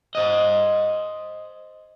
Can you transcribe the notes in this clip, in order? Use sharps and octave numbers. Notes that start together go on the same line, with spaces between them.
C5 D#5